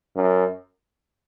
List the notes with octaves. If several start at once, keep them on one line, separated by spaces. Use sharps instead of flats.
F#2